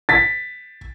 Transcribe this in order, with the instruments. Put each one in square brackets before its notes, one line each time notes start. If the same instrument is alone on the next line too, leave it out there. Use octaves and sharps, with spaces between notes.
[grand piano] A6 B6